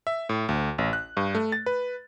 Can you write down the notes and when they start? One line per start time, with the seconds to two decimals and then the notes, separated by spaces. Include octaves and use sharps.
0.07 E5
0.29 A2
0.49 D2
0.78 A1
0.93 F#6
1.17 G2
1.35 A3
1.52 A6
1.66 B4